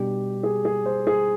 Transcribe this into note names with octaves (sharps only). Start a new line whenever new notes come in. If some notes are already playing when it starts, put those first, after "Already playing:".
Already playing: B2 G3 D4 G4
G#4
G#4
C5
G#4